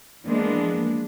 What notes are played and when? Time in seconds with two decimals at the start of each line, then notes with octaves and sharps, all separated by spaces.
0.24 E3 F3 G#3 A#3 B3 D4